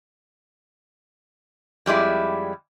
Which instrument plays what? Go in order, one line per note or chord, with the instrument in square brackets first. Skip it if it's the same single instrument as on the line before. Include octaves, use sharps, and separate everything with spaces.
[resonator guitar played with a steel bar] F2 G3 G#3 E4